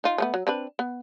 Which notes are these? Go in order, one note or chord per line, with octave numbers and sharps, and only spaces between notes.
D#4 F4
F3 A3 B3
F#3
C4 D4 B4
B3